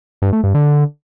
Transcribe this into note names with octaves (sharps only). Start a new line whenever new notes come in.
G2
A3
G2
D3